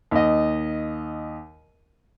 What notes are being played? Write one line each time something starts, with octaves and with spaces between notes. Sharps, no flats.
D#2 D#5